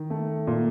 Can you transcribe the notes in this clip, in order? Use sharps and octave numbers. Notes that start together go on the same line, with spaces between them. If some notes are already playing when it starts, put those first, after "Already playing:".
Already playing: D#3
A3
A#2